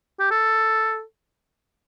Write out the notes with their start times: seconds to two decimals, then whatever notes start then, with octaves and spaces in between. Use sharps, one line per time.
0.20 G4
0.31 A4